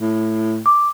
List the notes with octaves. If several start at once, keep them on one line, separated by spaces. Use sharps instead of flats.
A2
D6